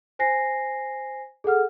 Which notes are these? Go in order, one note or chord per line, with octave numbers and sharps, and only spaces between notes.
C5 G#5 A#6 C7
G#4 A4 F#5 F6